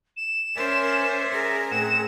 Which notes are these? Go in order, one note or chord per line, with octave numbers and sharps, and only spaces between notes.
E7
C#4 A#4 C5 D5 E5 G#5
G#4 A#4
A2 C4 F#5 E7